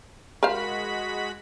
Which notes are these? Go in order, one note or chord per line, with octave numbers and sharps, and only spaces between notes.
G#3 F#4 A#4 C5 F5 B5